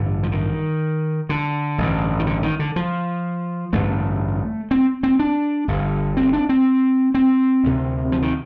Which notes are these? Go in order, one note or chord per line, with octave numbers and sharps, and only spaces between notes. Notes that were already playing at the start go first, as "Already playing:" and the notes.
Already playing: A1 G2 D3
F3
D#3
D3
A1 G2 D3
D#3
D3
D#3
D3
F3
A1 G2 D3 A3
C4
C4
D4
G1 G2 D3
C4
D4
C4
C4
D2 C3
F3
D#3